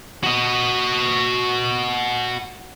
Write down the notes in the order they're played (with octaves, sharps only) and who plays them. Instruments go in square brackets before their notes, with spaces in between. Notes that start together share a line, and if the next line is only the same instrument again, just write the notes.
[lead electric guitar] F#4 D#5